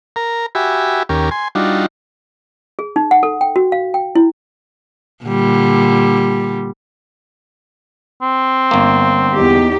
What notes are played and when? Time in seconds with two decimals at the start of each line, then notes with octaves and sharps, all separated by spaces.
0.16 A#4 A#5
0.55 F#4 G4 E5 G#5 B5
1.09 D#2 C#4 G4 A#4
1.31 G#5 C6
1.55 G3 D4 D#4 F4 F#4
2.79 G#4
2.96 D#4
3.11 F#5
3.23 A4
3.41 G5
3.56 F#4
3.72 F5
3.94 G5
4.15 E4
5.25 A#2 D3 G3
8.22 C4
8.71 G1 A#3
9.33 E2 D#4 G4